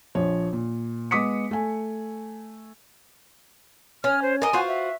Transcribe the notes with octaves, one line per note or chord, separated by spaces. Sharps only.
A#1 F3 C#5
A#2
G#3 B3 D6 D#6 B6 C#7
A3 G#5
C#4 F6
C5
A#4 D#5 G#5
F4 F#4 C5
E5